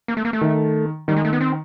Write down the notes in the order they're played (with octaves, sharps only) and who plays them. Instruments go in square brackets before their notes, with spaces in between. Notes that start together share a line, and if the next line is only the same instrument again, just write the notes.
[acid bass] A#3
A3
A#3
A3
[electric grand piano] D#3
[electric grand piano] D#3 [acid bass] G3
[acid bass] G#3
A3
B3
C4